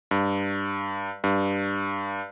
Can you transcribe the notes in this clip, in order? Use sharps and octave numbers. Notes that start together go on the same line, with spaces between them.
G2
G2